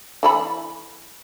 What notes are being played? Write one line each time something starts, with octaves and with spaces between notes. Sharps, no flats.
E3 A4 B5